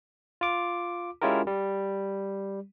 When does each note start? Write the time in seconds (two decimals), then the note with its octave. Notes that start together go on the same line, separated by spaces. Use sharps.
0.41 F4 D6
1.22 G#3 C#4 E4 F4 G4 A#4
1.47 G3